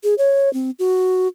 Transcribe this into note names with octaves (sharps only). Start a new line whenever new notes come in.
G#4
C#5
C4
F#4